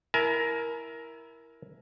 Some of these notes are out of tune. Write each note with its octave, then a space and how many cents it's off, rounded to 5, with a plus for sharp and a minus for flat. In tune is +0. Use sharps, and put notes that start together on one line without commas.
E4 +5 A#4 +10 G#5 +45